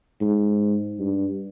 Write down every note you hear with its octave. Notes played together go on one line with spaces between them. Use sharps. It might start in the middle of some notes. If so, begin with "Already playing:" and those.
G#2
G2